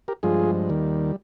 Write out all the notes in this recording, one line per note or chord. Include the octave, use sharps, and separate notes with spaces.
G4 A#4
G2 F3 G#3 F4 G#4
D#2 D#3 G3